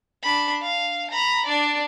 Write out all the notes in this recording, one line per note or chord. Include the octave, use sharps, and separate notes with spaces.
D4 B5
F5
A#5 B5
D4 D5